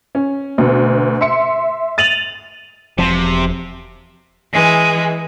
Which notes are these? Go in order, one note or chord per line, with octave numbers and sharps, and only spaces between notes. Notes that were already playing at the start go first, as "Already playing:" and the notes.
C#4
D2 B2
E5 C6 C#7
A6 D#7 F7 F#7
E1 C3 F3
E3 G#3